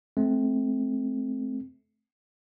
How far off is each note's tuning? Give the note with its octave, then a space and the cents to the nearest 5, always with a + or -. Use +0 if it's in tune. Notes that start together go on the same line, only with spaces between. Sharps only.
A3 -30 C4 +0